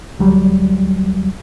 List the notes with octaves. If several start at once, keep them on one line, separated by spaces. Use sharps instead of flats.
D2 F#3 G3